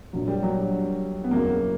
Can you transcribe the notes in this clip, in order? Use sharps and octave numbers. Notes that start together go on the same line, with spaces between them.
A#1 A#2 F#3
G3
F#3
B3
F#1 E2 C#3 F#3 A#3